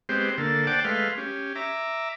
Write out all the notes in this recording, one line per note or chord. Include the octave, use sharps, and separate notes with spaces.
G#3 B3 C4 G4 C5
D3 A#3 A4
C5 D5 F#5 G5 A5 D6
G#3 A3 B4 F5 C6
C#4 G4
E5 A#5 D6